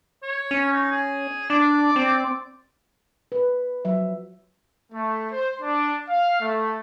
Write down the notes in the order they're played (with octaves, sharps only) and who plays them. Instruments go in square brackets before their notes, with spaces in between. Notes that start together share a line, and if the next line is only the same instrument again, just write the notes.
[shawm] C#5
[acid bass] C#4
[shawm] D#4
G#4
[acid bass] D4 [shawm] D5
[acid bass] C4
[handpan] B4
F3 F#3 E5
[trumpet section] A3
C5
D4
F5
A3